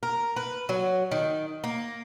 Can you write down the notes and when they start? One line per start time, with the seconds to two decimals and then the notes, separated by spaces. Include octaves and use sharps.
0.03 A#4
0.36 B4
0.69 F#3
1.11 D#3
1.64 A#3